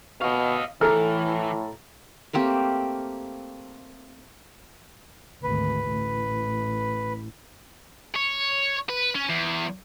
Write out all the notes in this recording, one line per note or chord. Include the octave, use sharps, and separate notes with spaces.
B2 D#5 F5 C#6
A2 E3 A4 A#5 F6
A3 A#3 C4 G4
G#1 D2 B4
A1
C#5
B4
C#4
E2